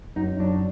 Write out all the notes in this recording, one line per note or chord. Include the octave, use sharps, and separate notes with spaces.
F#2 D#4
F#3 D4